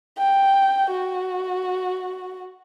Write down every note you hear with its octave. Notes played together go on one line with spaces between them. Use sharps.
G5
F#4